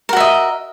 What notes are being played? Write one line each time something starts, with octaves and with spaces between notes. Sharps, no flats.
F#4 A#4 D#5 E5